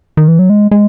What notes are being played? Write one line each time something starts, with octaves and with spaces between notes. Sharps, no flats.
D#3
E3
F#3
G#3
G#3